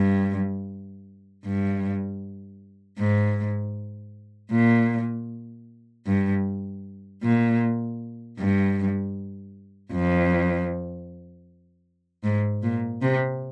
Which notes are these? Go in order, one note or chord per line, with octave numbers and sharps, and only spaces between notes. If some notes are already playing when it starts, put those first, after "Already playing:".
Already playing: G2
G2
G#2
A#2
G2
A#2
G2
F2
G#2
A#2
C3